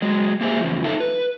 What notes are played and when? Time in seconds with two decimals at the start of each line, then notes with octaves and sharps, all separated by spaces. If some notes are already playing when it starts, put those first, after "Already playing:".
0.02 F#3 G#3
0.41 A#3 G4 G#4 C5 E5
0.61 E2 C#3 F3
0.84 D#4 F4 A4 E5
1.00 B4